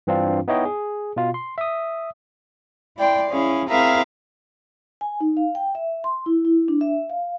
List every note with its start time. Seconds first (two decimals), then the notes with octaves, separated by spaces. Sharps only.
0.07 G2 E3 C4 D4 F4
0.48 B3 D#4 E4 C#5 D#5 G5
0.65 G#4
1.16 B2 F4
1.34 C6
1.58 E5 D#6
2.97 E4 D5 G5 C6
3.31 C#4 E4 G#4 F5
3.69 C4 E4 G#4 A#4 E5 F5
5.01 G#5
5.21 D#4
5.37 F5
5.55 G5
5.75 E5
6.04 C6
6.26 E4
6.45 E4
6.68 D4
6.81 E5
7.10 F5